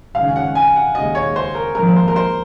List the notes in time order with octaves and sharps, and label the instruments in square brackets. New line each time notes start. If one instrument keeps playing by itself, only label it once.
[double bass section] G#1 F#2 C#3 G#3 C#4 [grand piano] F5
[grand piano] F#5
G#5
F#5
[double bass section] D#2 C#3 G#3 [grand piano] D#5
[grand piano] C#5
C5
A#4
[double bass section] G#1 G#2 F3 A#3 [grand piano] A#4
[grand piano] C5
A#4
C5